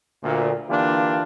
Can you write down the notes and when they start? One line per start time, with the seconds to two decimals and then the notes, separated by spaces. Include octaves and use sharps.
0.23 D2 A#2
0.69 D3 E3 A#3 D4 F4 G4